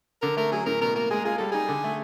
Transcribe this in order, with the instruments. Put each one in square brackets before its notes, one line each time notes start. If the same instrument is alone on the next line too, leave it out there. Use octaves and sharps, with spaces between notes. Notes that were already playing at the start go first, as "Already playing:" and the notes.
[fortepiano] D3 [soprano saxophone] A#4
[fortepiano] A3 [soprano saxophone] A#4
[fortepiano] F#3 [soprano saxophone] G#4
[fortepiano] A2 [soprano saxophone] A#4
[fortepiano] B2 [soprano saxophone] A#4
[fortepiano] A#3 [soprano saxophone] A#4
[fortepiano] G#3 [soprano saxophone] G#4
[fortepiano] F4 [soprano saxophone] G#4
[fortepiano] G3 [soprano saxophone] A4
[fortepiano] D#4 [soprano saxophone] G#4
[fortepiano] D3
A3